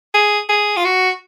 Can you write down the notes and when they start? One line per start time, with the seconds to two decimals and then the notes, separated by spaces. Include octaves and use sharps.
0.14 G#4
0.49 G#4
0.77 F4
0.85 F#4